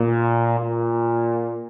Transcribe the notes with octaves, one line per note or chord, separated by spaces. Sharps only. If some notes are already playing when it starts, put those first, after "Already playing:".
Already playing: A#2
A#2